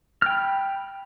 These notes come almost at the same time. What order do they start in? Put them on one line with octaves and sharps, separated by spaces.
F6 G5 B5